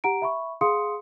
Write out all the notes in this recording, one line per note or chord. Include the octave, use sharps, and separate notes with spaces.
G4 F#5 A#5 D7
E5 B5 C#6
G#4 F5 F#5 C6 D#6 C#7